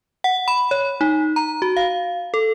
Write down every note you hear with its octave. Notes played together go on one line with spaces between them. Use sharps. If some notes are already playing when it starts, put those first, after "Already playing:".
F#5
B5
C#5
D#4
A#5
F#4
F5
A4